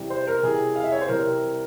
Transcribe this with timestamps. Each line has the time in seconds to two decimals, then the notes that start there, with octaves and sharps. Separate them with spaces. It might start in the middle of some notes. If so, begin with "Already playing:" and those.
Already playing: C3 E3 G3
0.10 C5
0.27 A#4
0.43 C3 E3 G3 G#4
0.76 F5
0.84 E5
0.92 C#5
1.01 C5
1.09 C3 E3 G3 A#4